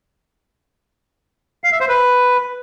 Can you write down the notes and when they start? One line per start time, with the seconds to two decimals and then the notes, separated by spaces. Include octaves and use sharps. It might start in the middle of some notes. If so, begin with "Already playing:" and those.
1.64 F5
1.72 E5
1.80 C5
1.89 B4